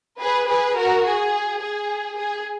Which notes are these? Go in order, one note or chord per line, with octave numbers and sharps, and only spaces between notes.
G#4 B4
G#4 B4
F#4 A#4
G#4
G#4
G#4